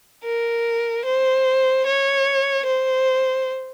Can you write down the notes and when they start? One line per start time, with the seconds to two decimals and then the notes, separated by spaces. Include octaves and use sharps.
0.24 A#4
1.05 C5
1.86 C#5
2.67 C5